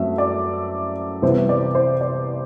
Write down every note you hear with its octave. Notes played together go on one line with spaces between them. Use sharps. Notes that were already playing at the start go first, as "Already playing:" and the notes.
Already playing: F#2 F#3 A3 C4 E5
D5
C2 C3 E3 B3 C5
D5
C5
D5